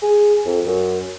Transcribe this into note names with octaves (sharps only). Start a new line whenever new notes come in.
G#4
F2
F#2